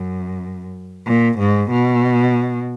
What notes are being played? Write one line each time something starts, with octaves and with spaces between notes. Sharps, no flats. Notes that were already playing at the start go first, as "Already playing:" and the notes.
Already playing: F#2
A#2
G#2
B2